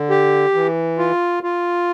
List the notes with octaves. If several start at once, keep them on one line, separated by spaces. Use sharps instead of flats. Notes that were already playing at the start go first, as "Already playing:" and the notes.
Already playing: D3
G4
E3
F4
F4